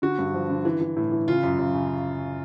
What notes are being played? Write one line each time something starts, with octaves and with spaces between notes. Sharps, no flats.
D3 F#4
G2
F3
D3
E3
E3
A2
E3
C#3 F4
F#2
F#2
C#3